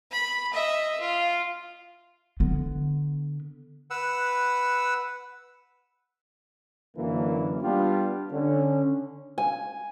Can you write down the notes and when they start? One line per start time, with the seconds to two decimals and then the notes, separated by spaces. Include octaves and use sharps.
0.12 B5
0.52 D#5 E5
1.00 F4
2.40 D3 B3
3.91 B4 F#5 E6
6.96 F#2 D3 E3 A#3
7.63 G3 B3 D4 F4 G4
8.31 D3 C#4
9.38 G#5